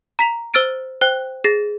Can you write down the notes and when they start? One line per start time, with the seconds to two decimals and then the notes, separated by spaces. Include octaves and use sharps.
0.19 A#5 B6 F7
0.54 C5 E6 F6 A6 D7 D#7
1.01 C5 G5 F#6
1.44 G#4 A6 A#6 C7